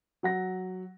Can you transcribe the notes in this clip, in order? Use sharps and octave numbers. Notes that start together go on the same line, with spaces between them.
F#3 F#5 A#6